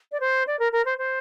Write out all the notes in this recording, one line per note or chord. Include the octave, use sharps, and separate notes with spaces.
D5
C5
D5
A#4
A#4
C5
C5